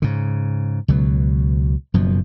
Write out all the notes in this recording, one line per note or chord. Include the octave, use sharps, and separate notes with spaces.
G#2 C#3
C#2 B2 F#3
F#1 F#2 B2 F3